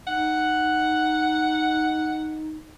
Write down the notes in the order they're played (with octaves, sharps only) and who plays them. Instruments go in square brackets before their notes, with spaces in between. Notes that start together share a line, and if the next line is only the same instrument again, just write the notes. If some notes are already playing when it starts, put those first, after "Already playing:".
[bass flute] D#4 [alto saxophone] F#5